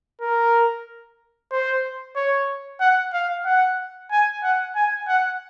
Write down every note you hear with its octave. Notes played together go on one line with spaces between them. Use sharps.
A#4
C5
C#5
F#5
F5
F#5
G#5
F#5
G#5
F#5